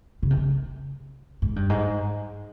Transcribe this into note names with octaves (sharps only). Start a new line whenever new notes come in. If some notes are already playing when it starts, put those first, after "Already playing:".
C#3
C3
C#3
G#2
G2
G#2